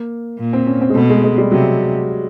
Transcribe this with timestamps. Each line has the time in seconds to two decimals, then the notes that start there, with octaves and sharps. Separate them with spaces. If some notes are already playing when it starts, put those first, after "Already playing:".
Already playing: A#3
0.39 A#2
0.53 C4
0.67 C#4
0.81 C4
0.90 G#3
0.95 B2 A3
1.10 G#3
1.24 G#3
1.38 G3
1.52 C3 F#3